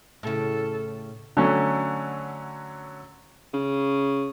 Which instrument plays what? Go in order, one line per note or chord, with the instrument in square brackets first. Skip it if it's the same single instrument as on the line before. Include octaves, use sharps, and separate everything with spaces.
[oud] A2 C#3 [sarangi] A4
[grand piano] D3 F#3 A3 C#4
[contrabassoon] C#3